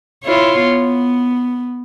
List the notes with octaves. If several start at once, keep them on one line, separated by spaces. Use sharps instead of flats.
E4 F4 C#5
B3